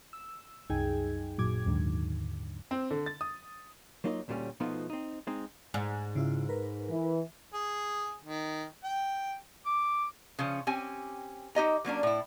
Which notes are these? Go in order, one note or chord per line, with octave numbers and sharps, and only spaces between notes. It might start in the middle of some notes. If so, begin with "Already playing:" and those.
E6
C2 F#2 D#4 G#4 G5 G#6
A1 F#2 A#2 F#3 D6 G#6
D#2 G#2 D3 D#3
C4
D3
A6
D#6
F#3 A#3 D#4 F4 C5 D#5
D2 A#2 D3 G3 C#4
B2 F3 A3 B3 D#4 F4
C4 D#4
G#3 C4 D#4
G#2 G#5
C#3 E4 F4
A#4 B4
E3
G#4
D#3
G5
D6
C#3 F3 C#4
C4 C#4 G4 G#5
D#4 G4 D#5 A#5
F#3 A#3 C#4 D4
A2 E4